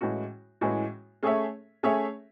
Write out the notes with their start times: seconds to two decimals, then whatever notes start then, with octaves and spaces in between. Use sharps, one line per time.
0.01 A2 E3 G#3 C#4 F#4
0.61 A2 E3 G#3 C#4 F#4
1.23 A3 C#4 G#4 C#5 E5
1.83 A3 C#4 G#4 C#5 E5